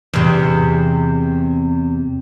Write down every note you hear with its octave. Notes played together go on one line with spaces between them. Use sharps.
E2 C3